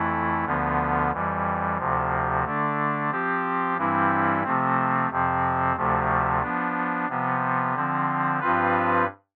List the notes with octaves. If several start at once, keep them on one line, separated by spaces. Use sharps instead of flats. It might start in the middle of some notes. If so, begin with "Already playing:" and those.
Already playing: F2 E3 A3 E4
D2 D3 F3 B3
F2 E3 G3
D2 C3 F3
D3 A3 D4
F3 C4 G4
G2 E3 G3 C4 E4
C3 F3 A3 C4
F2 C3 F3 C4
D2 C3 F3 A3
F3 B3 D4
C3 F3 B3
D3 F3 C4
G2 F3 C4 F4 B4